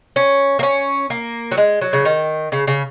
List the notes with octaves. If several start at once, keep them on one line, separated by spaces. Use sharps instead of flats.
C#4
A#3
C#4
A#3
F#3
G#3
F#3
C#3
D#3
C#3
C#3